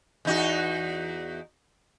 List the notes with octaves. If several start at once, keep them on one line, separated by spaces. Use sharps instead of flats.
E2 D#4 F#4